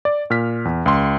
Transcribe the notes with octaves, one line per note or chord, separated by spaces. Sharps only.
D5
A#2 F6 B6
E2
C#2 C6